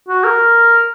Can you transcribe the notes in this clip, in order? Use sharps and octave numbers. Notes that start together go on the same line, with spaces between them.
F#4
A#4